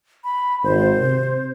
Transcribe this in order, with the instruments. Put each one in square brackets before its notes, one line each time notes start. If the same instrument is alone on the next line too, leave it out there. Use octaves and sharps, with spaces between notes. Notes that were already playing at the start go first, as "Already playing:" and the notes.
[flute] B5
[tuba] G#1 [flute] C5
[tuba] C3